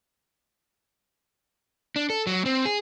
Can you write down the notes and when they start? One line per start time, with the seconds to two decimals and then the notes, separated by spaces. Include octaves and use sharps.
1.96 D4
2.10 A4
2.27 F#3
2.46 C4
2.65 G#4